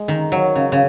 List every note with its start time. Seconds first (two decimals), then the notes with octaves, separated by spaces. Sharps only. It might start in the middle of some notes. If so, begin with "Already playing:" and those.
Already playing: G#3
0.08 D#3
0.32 F#3
0.55 C#3
0.72 C#3